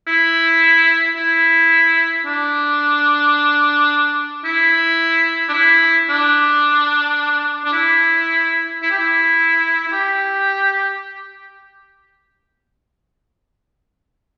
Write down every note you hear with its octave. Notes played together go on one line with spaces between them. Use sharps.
E4
E4
D4
E4
D4
E4
D4
D4
E4
E4
G4
E4
E4
G4